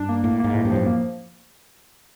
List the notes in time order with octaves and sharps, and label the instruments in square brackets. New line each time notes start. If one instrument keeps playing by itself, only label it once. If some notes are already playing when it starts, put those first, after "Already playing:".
Already playing: [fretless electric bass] G2 [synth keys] D4
[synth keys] A#3
[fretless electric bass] A2 [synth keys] A#3
[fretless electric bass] G#2 [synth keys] A#3
[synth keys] A2
[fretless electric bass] G2
[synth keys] F3
[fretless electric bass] F#2
[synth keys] A#3